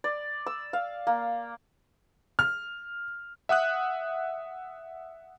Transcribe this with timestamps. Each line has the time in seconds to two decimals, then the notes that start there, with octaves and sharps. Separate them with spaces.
0.04 D5
0.46 E6
0.73 F5
1.07 A#3
2.39 F6
3.49 E5 F#5 D#6 F#6